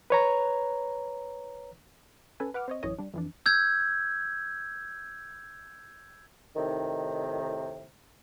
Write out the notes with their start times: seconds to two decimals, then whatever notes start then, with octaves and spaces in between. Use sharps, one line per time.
0.10 B4 C#5 A#5
2.40 C#4 A4 B4 G#5
2.54 B4 F#5 D6 F6
2.68 C4 C#5 D#5
2.83 A1 F#2 E3 C#5 D#5
2.98 G3 D4
3.14 F2 E3 D4
3.46 E6 G6 G#6
6.56 A2 C3 D#3